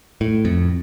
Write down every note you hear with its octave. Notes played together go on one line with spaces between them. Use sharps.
A2
F2